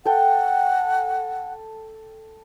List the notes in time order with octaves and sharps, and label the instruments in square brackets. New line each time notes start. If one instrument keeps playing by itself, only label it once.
[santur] A4 G5 [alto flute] F#5